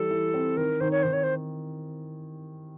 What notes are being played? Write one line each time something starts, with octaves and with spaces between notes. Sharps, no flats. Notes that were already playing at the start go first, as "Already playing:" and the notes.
Already playing: E3 G3 A4
E3
C4
D#3 A#4
D#3 C5
C#5
D#3 C5
C#5
C5